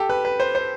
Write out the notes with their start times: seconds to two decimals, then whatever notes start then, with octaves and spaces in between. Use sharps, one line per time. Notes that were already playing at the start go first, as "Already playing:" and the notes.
Already playing: G4 A4
0.10 B4
0.25 B4
0.40 C5
0.55 C5